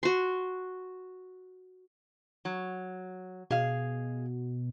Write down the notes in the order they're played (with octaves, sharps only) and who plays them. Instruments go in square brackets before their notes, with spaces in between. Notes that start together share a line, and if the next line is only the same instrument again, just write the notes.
[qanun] F#4 C6
[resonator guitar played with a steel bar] F#3
[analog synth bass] B2 [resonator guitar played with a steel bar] G#4 F5